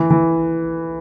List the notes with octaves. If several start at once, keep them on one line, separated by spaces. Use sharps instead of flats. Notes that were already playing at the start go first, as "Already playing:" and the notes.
Already playing: E3
E3